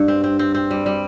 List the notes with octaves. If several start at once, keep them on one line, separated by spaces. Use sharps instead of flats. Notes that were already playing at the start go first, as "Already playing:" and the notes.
Already playing: G2
C4
C4
C4
C4
G3
G3